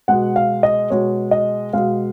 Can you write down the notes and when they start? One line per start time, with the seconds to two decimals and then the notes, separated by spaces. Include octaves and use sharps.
0.08 B2 G#3 F#5
0.36 F5
0.63 D#5
0.90 B2 G#3 C#5
1.31 D#5
1.73 B2 G#3 F5